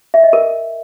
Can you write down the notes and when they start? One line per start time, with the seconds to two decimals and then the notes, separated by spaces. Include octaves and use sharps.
0.14 E5
0.23 D#5
0.33 A#4